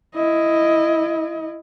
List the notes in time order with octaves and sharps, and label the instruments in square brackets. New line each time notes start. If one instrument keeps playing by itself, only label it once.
[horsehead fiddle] E4 D#5